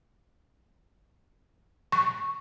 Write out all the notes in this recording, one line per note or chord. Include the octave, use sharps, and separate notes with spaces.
C#6